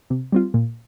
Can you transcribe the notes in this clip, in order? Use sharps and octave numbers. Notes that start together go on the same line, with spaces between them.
C3
G3 C4 F4
A#2